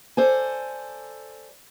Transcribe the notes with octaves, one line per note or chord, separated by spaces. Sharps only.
A4 C5 D5 G#5